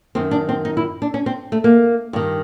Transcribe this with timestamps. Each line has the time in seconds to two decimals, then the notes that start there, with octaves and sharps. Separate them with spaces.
0.15 F#2 D#3 C4
0.31 D4
0.49 C4
0.65 D#4
0.77 E4
1.02 D4
1.14 C#4
1.26 C4
1.52 A3
1.64 A#3
2.13 G2 D#3